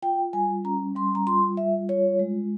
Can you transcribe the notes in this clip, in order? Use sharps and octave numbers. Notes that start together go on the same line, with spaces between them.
F4 G5
G3 G#5
C#4 A#5
G3 C6
A#5
F4 C6
G3 E5
F4 C#5
G#3